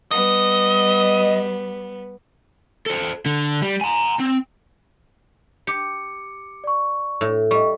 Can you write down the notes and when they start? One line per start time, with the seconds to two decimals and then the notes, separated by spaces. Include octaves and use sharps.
0.11 G3 B3 D#5
2.86 A4 C5
3.26 D3
3.62 G3
3.81 G#5 A#5
4.20 C4
5.67 G4 D6 C#7
6.64 D5 C#6
7.21 A2
7.51 G3 D#5 C#6